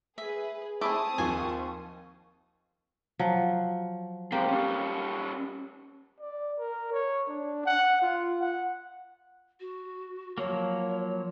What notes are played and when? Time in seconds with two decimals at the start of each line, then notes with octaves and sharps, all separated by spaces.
0.18 G#4 B4 E5
0.81 A3 C4 E4 G#4 A5 D6 D#6
1.18 D#2 F3 G#5 C6 C#6
3.19 F3 F#3
4.32 G#3 A#3 C4 G4
4.48 G3 C#4
6.20 D5
6.58 A#4
6.92 C#5
7.29 D4
7.66 F#5
8.02 F4
8.40 F#5
9.60 F#4
10.38 F3 F#3 A#3 C#5